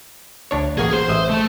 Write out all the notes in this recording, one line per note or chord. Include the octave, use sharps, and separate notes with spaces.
D2 D4 C#5
A1 A#3 F#4 G#4
C5
A1 D#5 E5
A3